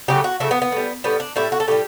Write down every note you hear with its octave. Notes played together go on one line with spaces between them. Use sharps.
C#3 F#3 A3 G4
F#4
C#3 F#3 A3 E4
B3
B3
A2 G3
A2 G3 B3
D4
A2 G3 E4
F#4
A4
A2 G3 G4